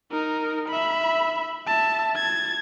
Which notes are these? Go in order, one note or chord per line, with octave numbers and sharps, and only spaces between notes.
D#4 A#4
E5 B5
E5 A5
G#6 A6